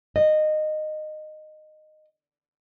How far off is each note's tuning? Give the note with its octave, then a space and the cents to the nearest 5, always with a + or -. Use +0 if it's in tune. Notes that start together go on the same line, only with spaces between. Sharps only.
D#5 -15